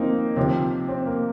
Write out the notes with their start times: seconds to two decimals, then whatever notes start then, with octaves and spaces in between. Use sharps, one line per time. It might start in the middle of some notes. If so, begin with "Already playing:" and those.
Already playing: F3 A#3 C4 D#4
0.36 C3 F3 C4
0.88 C4
1.06 A#3